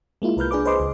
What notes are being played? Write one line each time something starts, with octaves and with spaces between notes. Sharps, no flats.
G#3 A#3 E4 F4
C2 A#4 B4 F6 G6
D4 G#4 B4 D6
G#4 B4 C5 D#5 C6 D6
C#2